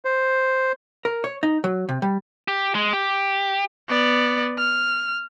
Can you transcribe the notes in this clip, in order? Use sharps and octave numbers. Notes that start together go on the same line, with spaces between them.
C5
A#4
C#5
D#4
F#3
C3
G3
G4
G#3
G4
B3 D5
F6